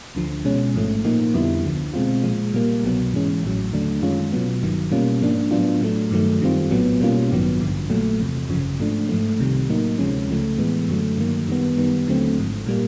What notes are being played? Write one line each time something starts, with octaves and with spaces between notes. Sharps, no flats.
D2 D3 F3
B2 G#3 C#4
A1 G#2 F3 A3
A#2 F3 A#3 D#4
F2 D3 G3 B3 E4
D2 D3 F3
B2 G#3 C4 F4
A#2 F3 G#3
A#2 G3 A#3
C2 B2 F#3 B3
G#2 E3 G#3 C#4
A1 A2 F#3
D#2 D3 F#3 A3 D4
F#2 D#3 G#3 C#4 F4
B2 F#3 B3
G1 G2 D#3 F#3
B2 G3 A#3 C#4 F4
G#2 F3 A#3 D4
A2 F#3 B3 D4 F4
A2 F#3 A3
G2 D#3 F#3 A3
F#2 D#3 G3 C4 F4
A#1 A2 F#3 B3
B2 G3 A#3 C#4 F4
A1 G2 D#3 F#3 B3
A1 G2 D3 F3
A#1 A#2 F#3 A3
E2 C3 F3
G#1 F#2 C#3 F3
G#2 F3 A3 D4
G#2 F3 A3
C2 C3 D#3 G3
A2 F#3 A#3 D#4
D2 C3 F3 G#3 C#4
C#2 C#3 F3 A3
A2 E3 G#3 B3
F#2 D3 F#3 A3
G2 D#3 F#3 A#3
F#2 D#3 G3 B3
F#2 D#3 G3 B3
D#2 D3 F#3 A3 C4
G#1 G#2 F3
A#2 G3 A#3